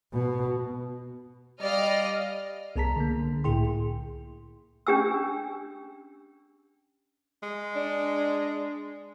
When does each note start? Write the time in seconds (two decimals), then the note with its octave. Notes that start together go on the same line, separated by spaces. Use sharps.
0.13 B2
1.62 G3 D5 D#5 F5 F6
2.76 C2 B3 G#4 A5 A#5 B6
2.96 D3 A#3
3.44 C2 A2 E4 G#4 G5 C6
4.87 C#4 D4 G4 G#5 E6
7.43 G#3
7.75 D4